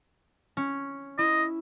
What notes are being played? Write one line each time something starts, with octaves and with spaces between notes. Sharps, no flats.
C#4
E4 D#5